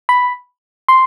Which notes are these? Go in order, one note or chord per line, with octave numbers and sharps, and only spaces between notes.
B5
C6